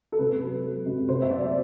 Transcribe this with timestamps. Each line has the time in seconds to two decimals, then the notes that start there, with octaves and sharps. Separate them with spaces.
0.12 A4
0.18 C3 B4
0.41 F#3
0.63 F#3
0.86 C3
1.08 C3 C5
1.22 E5
1.30 F#3 D5
1.44 D5